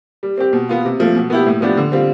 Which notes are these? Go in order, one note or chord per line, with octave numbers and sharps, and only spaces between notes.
G3
C4 G4
B2
B3 F4
C3
F3 A3
B2
B3 E4 G4
A2
F3 B3 D4 G4
D3
G3 C4 F4